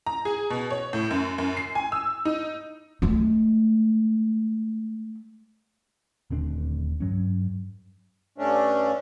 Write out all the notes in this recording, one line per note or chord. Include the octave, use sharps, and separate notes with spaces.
A#5
G#4
B2
C#5
A2
F#2
F#2
C7
G#5
E6
D#4
G#3 A3
D#1 D2 C4 D4
G2 F#3 C#4
G2 A3 C#4 D4